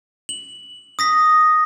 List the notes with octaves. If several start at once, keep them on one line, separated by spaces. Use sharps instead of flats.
F#7
D#6 A#6 B6